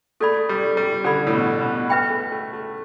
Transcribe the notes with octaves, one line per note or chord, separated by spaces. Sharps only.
A3 A4 D5 B5
G3
G3
D3 A4 D5 B5
A2
B2
B2
B4 E5 G5 B5
A3
A3
A3